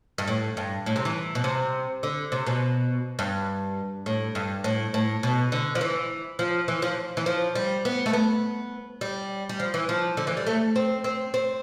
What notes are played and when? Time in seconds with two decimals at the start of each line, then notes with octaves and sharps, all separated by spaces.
0.18 G2
0.27 A2
0.57 G2
0.86 A2
0.96 C3
1.05 E3
1.35 B2
1.44 C3
2.03 D3
2.32 C3
2.46 B2
3.19 G2
4.06 A2
4.35 G2
4.64 A2
4.94 A2
5.23 B2
5.52 D3
5.75 F3
5.81 E3
6.39 F3
6.68 E3
6.82 F3
7.17 E3
7.26 F3
7.55 G3
7.85 B3
8.06 A3
8.13 B3
9.01 G3
9.49 G3
9.60 F3
9.74 E3
9.89 F3
10.17 D3
10.27 E3
10.37 G3
10.47 A3
10.76 C4
11.04 C4
11.34 C4